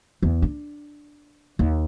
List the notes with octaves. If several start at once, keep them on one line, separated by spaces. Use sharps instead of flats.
E2
D4
D#2